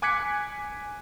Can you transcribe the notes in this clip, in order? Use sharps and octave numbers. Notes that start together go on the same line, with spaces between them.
G#5 D6 F#6 G#6 B6 C#7